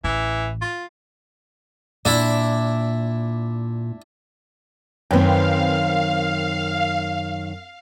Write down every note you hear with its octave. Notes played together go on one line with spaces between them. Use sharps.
A1 E3
F4
A#2 D4 E4
F#2 D#3 C4 B4 F5 G5